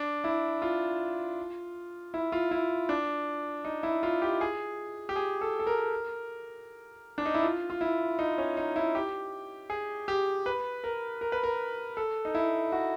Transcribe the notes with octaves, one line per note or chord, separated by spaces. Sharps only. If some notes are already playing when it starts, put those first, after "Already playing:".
Already playing: D4
E4
F4
E4
F4
E4
D4
D#4
E4
F4
G4
G#4
G4
G#4
A4
A4
A#4
D4
D#4
E4
F4
F4
E4
D#4
C#4
D#4
E4
G4
G#4
G4
B4
A#4
A#4
B4
A#4
A4
D#4
E4
F#4